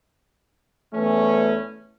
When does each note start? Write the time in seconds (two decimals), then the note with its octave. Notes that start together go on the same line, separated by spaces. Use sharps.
0.93 E2 E3 A3 C#4